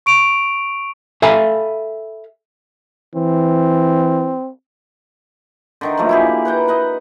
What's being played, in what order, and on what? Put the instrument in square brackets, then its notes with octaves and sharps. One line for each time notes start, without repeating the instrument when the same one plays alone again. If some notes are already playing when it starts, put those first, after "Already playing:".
[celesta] C#6 D7 F7
[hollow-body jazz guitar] A4 E5 F5 G#5 A#5 B5
[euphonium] E3 [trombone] C4
[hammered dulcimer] D3 D#3 D#4
F3 F#3 A3 A#3
E4 G4 G#4
B4 F#5 G5 A#5
D#4 D#5 F#5